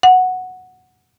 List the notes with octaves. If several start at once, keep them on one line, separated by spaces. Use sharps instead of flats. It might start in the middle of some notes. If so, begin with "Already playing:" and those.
F#5